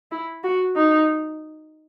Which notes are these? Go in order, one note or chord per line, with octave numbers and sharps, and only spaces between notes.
E4
F#4
D#4